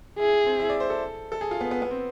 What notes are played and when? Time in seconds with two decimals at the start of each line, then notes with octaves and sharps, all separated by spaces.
0.19 E4 G#4
0.46 C4
0.59 E4
0.69 D5
0.80 C5
0.90 A4
1.32 A4
1.41 G#4
1.51 F4
1.61 B3
1.71 B3
1.82 B3
1.91 C4